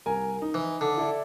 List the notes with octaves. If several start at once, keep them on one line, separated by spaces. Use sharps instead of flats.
C2 A#4 G#5
D#4
E3
D3
E4 A4 D5